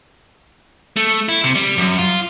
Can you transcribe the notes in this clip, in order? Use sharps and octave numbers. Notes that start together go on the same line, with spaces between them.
A3
E4
C3
G3
F#2
F4